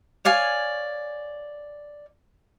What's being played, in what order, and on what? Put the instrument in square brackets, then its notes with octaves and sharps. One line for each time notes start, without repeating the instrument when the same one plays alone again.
[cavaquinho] C#5 D5 F5 G#5